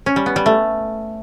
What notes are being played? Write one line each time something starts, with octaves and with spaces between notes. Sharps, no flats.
C#4
G3
B3
G3
A3